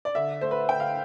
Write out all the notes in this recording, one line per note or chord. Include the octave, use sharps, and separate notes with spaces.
D5
D3 E5
A3 C5
B4
D3 G5
F5